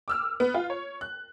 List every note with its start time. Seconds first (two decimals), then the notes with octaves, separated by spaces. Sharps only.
0.08 D6 E6 F6
0.40 B3
0.54 F4
0.70 C#5
1.01 F#6